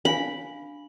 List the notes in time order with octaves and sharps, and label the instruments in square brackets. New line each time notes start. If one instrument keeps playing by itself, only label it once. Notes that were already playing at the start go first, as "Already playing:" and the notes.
[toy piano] D4 F5 G#5 [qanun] B5